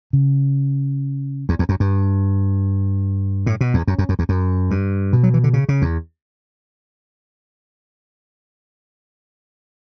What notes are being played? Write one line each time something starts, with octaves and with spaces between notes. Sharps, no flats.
C#3
E2
E2
F#2
G2
A2
B2
E2
F#2
F#2
F#2
E2
F#2
G2
B2
F#3
E3
D3
C#3
C#3
E2